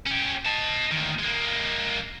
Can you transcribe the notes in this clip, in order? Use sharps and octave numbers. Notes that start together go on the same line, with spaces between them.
C#4 G4
D#5 A5
D2 D#3
G#3 A#3